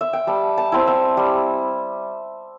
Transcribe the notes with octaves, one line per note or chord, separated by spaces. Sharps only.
E5
G5
G3 A5
A5
C4 E4
E5
G3